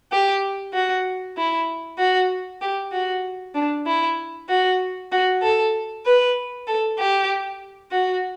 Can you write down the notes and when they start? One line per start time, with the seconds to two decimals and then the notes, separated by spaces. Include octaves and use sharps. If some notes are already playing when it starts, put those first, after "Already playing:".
0.12 G4
0.73 F#4
1.37 E4
1.98 F#4
2.61 G4
2.92 F#4
3.55 D4
3.86 E4
4.49 F#4
5.12 F#4
5.42 A4
6.06 B4
6.67 A4
6.98 G4
7.92 F#4